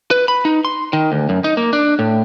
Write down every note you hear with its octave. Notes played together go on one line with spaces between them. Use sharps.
B4
B5
D#4
C6
D#3
D2
F#2
D#4
A#3
D4
A2